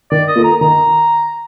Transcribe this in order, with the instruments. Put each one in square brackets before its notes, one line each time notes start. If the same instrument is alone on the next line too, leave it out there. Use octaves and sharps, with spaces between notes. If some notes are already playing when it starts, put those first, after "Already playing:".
[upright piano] D#3 [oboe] D5
[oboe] D#5
[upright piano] A#3 F4 A4
[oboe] A#5
[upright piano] D#3 [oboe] A#5